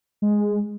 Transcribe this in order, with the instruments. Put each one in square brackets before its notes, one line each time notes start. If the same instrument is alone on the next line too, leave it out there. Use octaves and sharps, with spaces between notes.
[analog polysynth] G#3